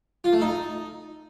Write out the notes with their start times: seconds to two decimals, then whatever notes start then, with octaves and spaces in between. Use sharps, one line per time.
0.24 F4
0.33 A3
0.41 D#4